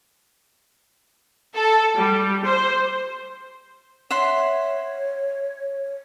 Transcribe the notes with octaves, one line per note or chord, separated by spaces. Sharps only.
A4
G3
C5
C#5 E5 F#5 C6